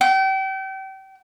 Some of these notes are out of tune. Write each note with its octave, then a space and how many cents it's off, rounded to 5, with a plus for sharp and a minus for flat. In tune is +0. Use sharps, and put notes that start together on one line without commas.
G5 -35